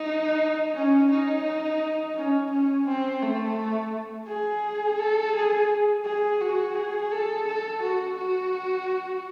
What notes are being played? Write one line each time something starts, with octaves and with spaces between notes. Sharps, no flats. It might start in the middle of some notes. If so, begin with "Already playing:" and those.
Already playing: D#4
C#4
D#4
C#4
C#4
C4
A3
G#4
A4
G#4
G#4
F#4
G#4
A4
A4
F#4
F#4